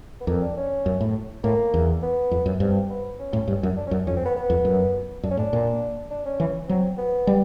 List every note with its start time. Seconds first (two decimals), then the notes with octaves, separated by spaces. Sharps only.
0.21 B3
0.27 F2 A#3
0.42 D4
0.57 C#4
0.86 F#2
1.01 A2
1.44 A2 A#3
1.74 E2
2.03 B3
2.31 F2
2.46 F#2
2.60 G2 C4
2.90 B3
3.20 C#4
3.33 A2
3.48 G2
3.63 F#2
3.77 D4
3.87 C#4
3.91 F#2
4.07 F2 C#4
4.16 C4
4.25 B3
4.36 B3
4.50 F2
4.65 F#2
5.23 F#2 D4
5.31 C#4
5.37 A2 D4
5.53 A#2
6.11 D4
6.25 C#4
6.40 E3
6.68 F#3 C4
6.98 B3
7.27 G3